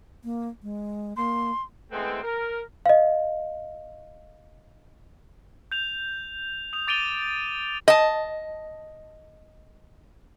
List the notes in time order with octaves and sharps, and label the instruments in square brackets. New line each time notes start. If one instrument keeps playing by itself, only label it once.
[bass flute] A#3
G#3
[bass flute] A#3 [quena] C6
[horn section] E3 G#3 A3 B3 C4
A#4
[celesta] D#5 F5
[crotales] G6 F7
D#6 F7
D6 A6 D7 D#7 F7 G7
[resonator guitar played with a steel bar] D#5 A5